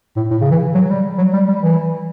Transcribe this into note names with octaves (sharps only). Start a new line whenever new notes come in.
A2
A2
C#3
E3
F#3
G3
F#3
G3
G3
E3